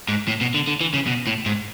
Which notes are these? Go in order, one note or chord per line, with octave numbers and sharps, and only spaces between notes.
G#2
A2
B2
D3
D3
E3
C#3
B2
A2
G#2